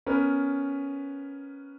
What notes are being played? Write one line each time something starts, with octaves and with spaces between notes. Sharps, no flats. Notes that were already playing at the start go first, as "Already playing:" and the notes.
B3 C#4 A#4 B4